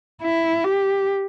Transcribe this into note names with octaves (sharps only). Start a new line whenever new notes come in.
E4
G4